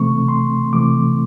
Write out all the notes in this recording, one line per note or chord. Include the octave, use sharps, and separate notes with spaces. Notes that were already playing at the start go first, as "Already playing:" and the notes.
Already playing: C3 E3 A3 C4 C#6
C6
C3 E3 A3 C4 D6